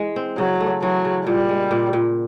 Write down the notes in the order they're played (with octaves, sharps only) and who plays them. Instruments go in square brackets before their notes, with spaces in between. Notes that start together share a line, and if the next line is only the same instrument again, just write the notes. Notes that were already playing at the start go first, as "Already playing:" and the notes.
Already playing: [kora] E3 G#3
C4
[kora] C#3 [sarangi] F#3
[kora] A3
[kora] E3 [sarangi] F#3
[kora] C#3
[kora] A#2 [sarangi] G3
[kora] G#3
A#2
A#2